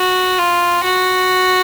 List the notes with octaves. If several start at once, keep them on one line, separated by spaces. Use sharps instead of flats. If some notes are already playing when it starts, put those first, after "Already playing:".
Already playing: F#4
F4
F#4